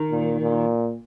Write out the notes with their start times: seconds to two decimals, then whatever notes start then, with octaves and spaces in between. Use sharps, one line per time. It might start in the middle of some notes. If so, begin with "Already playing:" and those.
Already playing: D#3
0.11 A#2
0.41 A#2